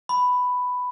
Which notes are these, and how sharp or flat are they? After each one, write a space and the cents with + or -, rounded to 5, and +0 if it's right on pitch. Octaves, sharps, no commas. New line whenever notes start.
B5 +5